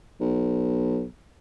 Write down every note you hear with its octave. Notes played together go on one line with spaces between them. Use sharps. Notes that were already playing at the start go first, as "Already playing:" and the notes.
B1